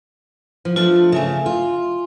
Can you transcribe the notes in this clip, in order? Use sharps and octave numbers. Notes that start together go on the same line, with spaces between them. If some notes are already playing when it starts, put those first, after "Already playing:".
F3
F3 A3 D4 F4
C#3 A3 E5 G#5
F4